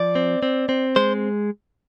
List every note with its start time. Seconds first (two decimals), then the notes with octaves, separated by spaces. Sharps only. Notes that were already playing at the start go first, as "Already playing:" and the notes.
Already playing: F3 D5
0.15 C4
0.43 C4
0.69 C4
0.96 G#3 C5